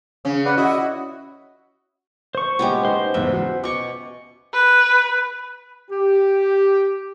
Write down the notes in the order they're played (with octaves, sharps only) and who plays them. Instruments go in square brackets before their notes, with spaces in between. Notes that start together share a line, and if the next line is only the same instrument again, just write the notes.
[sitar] C#3 C#4
[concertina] B4 D5 F#5
[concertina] E4 D#5 E5 [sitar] F#4
[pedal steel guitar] C5 C#6
[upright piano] A#2 G#3 [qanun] B3 C#4 G4
[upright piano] D#4 [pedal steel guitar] C5
[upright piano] F#1 E2 G#2 [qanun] E5
[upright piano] F#4
[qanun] B2 C#6 [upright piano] D6
[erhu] B4
[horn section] G4